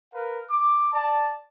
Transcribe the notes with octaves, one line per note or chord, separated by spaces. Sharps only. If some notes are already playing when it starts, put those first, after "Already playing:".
A#4 B4 F5
D6
D5 A5